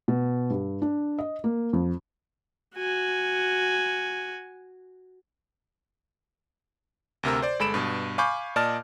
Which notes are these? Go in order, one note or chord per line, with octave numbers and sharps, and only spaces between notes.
B2
G2
D4
D#5
A#3
F2
F#4 G#5
D2 C3 A#4 E6
C5 D5
G1 G#3 A4 B5 D7 E7
G2 B2
F5 G#5 B5 C#6 D6 G6
A#2 D5 D#5 A5 F6